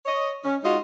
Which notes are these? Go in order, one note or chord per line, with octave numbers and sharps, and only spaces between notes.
C#5 D#5
C#4
G#3 D#4 F4 F#4 D#5